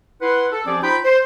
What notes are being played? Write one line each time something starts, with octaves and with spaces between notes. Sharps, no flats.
E4 B4 F#5 C6
A4
F3 C4 C#4 G4 G#4 D5
D#4 F4 C5 G5 B5
C5